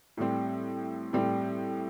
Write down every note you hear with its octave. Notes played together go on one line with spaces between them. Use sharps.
A2 G3 C4
A2 G3 C4